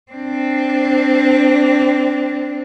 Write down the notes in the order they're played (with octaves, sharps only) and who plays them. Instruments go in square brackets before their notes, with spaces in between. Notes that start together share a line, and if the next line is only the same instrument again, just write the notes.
[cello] C4 D4